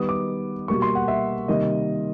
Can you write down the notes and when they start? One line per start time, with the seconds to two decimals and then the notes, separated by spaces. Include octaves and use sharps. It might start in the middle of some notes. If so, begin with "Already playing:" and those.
Already playing: D#3 G3 B3 D#6
0.09 D6
0.68 B2 G3 A#3 C#6
0.82 C6
0.95 F#5
1.08 E5
1.48 C3 D#3 G3 A#3 D#5